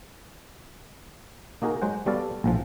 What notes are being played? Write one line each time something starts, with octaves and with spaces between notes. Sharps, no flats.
A#3 D#4 F#4 G#4 A#4
F#3 G#3 C5 F#5
G3 B3 F#4 A4 D5 F5
A#1 A2 F3